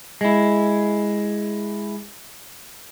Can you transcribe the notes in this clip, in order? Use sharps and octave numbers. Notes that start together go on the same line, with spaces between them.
G#3 E4